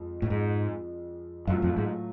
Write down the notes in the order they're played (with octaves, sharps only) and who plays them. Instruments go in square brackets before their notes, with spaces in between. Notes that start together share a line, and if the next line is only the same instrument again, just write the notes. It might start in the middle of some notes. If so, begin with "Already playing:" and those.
Already playing: [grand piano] F2 F3 G#3
[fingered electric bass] A2
G#2
[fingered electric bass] F#2 [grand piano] A2 F#3 A3 F4
[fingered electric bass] F2
G#2